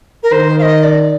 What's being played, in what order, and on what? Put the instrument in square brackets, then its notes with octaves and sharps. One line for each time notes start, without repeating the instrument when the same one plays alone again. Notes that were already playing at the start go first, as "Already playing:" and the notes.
[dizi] A#4
[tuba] D#3 [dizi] C5
[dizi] F5
D#5
D5